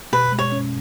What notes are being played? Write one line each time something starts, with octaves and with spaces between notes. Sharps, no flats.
B2 B4
G#3
C#5
C#4